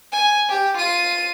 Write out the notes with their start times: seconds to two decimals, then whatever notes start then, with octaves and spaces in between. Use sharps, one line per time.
0.12 G#5
0.49 G4
0.78 F4 D#7